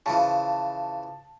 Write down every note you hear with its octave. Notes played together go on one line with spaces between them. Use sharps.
C#3 E3 F3 A5